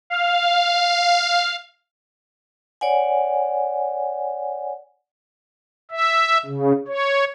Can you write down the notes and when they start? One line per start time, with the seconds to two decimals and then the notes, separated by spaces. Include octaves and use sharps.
0.10 F5
2.81 C#5 D5 F#5 G#5
5.91 E5
6.46 C#3
6.88 C#5